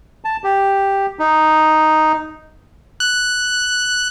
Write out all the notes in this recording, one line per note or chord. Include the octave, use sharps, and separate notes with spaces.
A5
G4
D#4
F#6